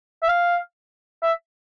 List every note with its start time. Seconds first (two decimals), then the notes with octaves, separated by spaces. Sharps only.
0.22 E5
0.28 F5
1.22 E5